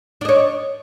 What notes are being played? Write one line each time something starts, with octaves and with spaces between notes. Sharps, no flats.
D4 C#5 D#5